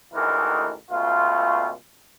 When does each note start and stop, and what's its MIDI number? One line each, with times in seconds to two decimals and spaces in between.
0.14 0.73 33
0.14 0.73 38
0.14 0.73 51
0.14 0.73 52
0.14 0.73 56
0.14 0.73 70
0.90 1.71 37
0.90 1.71 47
0.90 1.71 57
0.90 1.71 65